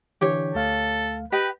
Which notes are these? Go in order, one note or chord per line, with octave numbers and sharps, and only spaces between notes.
D3 E3 D4 G4 C#5
D2 A3 A4 F5
G4 B4 D#5 G5